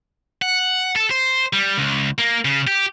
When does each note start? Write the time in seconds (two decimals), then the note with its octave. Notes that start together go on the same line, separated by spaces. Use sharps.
0.42 F#5
0.96 A4
1.11 C5
1.53 G3
1.78 C#2
2.18 A#3
2.45 C#3
2.67 G4